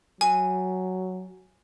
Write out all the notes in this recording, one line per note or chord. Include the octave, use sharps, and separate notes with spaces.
F#3 G#5